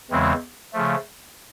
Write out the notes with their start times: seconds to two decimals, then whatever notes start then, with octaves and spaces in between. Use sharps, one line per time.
0.10 E2 C#3 E3 G#3 C4
0.73 C#3 F3 A3